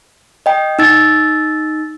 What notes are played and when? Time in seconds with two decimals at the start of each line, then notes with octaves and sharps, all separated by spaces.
0.46 D#5 G5
0.79 D#4 E6 A6